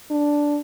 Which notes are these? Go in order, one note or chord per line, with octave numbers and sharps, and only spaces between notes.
D4